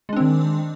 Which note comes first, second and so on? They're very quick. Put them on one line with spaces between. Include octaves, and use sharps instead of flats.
G#3 D4 C4 D#3